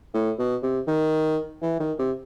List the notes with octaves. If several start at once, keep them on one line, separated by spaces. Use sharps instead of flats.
A2
B2
C3
D#3
E3
D#3
C3